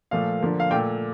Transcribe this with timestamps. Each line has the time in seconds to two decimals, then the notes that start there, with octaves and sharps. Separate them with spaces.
0.11 A#2 F3 A3 F5
0.41 D3 F3 A#3
0.60 F5
0.71 A#2 G5
0.74 A3